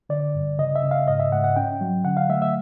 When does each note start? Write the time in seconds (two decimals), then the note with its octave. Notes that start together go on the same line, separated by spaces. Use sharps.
0.09 D3 D5
0.35 G2
0.58 C#3 D#5
0.75 E5
0.83 C#3
0.91 F5
1.08 G#2 D#5
1.20 E5
1.32 G#2 F#5
1.44 F#5
1.56 C#4 G5
1.81 F#3
2.04 D3 F#5
2.17 F5
2.29 A3 E5
2.42 E5